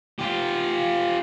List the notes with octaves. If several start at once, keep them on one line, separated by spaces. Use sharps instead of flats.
F4 G4